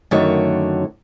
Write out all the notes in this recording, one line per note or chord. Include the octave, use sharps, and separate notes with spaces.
F#2 D3 D#3 A3 F#4 C#5